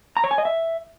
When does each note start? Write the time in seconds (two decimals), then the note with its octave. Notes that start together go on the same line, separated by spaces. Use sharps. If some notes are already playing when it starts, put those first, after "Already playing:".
0.17 A#5
0.24 C#5
0.31 G#5
0.38 D#5
0.45 E5